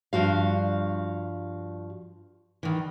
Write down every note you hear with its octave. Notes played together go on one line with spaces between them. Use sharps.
G2 F3 F#4 F5
D#3 E3